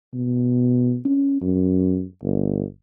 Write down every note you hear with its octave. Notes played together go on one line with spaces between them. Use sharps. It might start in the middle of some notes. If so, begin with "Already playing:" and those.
B2
C#4
F#2
G1